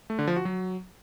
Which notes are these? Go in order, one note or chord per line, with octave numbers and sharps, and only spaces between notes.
A3
D3
F3
F#4
F#3